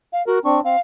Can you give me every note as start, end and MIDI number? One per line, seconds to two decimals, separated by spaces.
0.13 0.25 77
0.27 0.39 66
0.27 0.39 70
0.45 0.61 60
0.45 0.61 62
0.45 0.59 85
0.64 0.76 60
0.64 0.79 77